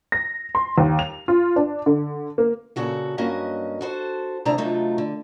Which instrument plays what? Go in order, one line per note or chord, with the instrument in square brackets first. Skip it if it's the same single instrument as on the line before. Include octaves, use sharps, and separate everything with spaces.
[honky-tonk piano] A#6
C6
D#2
F7
F4
D4
D3
A#3
[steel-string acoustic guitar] A#2 C#3 F#4 A4
G2 F#3 A#3 C#4 F#4 D#5
F#4 A4 C5
D2 A2 C3 D4 A#5
C3 F#3 A3 D#4 F4
D3